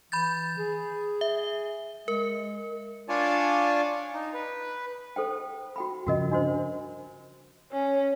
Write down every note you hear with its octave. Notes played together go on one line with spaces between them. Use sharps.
E3 B5 G6 A6
G#4
E5
G#3 A#4
D4 F4 C#5 D5 G#5 A5
D#4
B4
A4 C5 G5
F#4 G5 B5
G2 C#3 F3 F#4 A#4 D#5
D4 F#4 C5
C#4